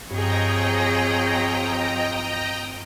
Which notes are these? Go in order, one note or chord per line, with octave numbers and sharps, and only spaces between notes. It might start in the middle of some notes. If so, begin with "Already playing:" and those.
G2 F3 C4 G#4 C#5 D#5 G5 A#5